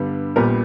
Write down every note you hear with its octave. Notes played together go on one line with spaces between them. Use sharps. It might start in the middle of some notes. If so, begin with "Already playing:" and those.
Already playing: G2 D3 G3 B3
A#1 A#2 G3 B3 A#4